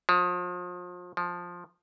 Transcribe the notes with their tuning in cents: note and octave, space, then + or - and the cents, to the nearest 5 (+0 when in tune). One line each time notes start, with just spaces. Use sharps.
F3 +35
F3 +10